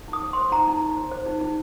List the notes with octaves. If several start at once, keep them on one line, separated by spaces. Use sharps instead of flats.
D#4
D#6
C5
C6
C5
D#4 A#5
D#4
D#4
C5
C5
D#4
D#4